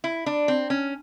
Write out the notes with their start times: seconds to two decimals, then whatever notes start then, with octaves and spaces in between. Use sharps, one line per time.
0.04 E4
0.26 D4
0.48 C4
0.70 C#4